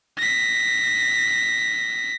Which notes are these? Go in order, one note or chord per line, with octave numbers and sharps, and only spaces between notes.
A#6 B6